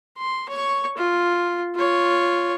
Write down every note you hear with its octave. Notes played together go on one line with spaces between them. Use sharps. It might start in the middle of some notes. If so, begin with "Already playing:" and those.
C6
C#5 C#6
F4
F4 C#5